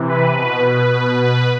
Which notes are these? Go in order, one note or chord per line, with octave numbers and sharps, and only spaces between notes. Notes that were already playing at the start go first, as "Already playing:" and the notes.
Already playing: C3 E3
B4
B2 B4
B4
B2
B4